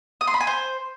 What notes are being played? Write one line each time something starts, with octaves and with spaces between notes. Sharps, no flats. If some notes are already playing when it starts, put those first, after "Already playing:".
D#6
C6
B5
G#5
C5